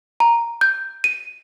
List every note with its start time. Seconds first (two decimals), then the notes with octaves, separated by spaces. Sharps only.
0.20 A#5
0.61 G6
1.04 D#7